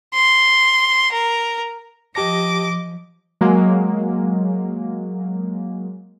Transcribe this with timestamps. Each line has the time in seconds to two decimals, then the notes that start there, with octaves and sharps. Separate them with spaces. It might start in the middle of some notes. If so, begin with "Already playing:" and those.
0.14 C6
1.12 A#4
2.15 F3 G4 D#5 A5 D6 A#6
3.41 F#3 G#3 A#3